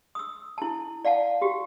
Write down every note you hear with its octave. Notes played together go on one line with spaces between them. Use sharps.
D#6 E6
E4 A5
D5 F5 F#5 A5
F#4 G4